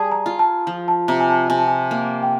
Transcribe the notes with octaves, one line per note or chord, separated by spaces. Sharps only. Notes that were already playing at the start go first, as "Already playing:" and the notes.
Already playing: G3 G#4 G#5 A5
A#5
F4
A5
F3
A5
C3 A#5
G#5
A5
C3 G#5
A5
G#5
A#3
G5